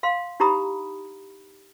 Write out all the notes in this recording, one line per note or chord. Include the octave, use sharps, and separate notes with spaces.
F5 C6
D#4 E4 G4 A#5 B5 D#6